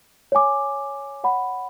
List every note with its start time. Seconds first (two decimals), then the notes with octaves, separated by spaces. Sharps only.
0.32 C#5 G#5 D6
1.24 C#5 F#5 B5